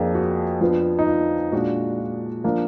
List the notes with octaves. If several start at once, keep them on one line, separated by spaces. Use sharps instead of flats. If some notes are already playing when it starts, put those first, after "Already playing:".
Already playing: F2 F3 A#3 D4 G#4
F#4
F2 F3 B3 D4 F4
D#4
F4
A#2 G#3 D4 F#4
F4
F3 A#3 D4